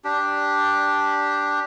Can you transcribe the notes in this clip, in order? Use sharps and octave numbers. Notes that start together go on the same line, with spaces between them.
D4 G4